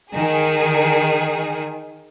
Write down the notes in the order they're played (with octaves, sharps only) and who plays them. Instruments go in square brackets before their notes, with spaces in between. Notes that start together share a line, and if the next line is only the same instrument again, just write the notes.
[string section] D#3 G#4